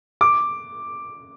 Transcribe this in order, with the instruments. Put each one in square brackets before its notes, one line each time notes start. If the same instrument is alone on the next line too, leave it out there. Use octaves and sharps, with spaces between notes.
[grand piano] D6